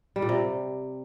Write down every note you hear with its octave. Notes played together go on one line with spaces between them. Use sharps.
G3
A#2
C3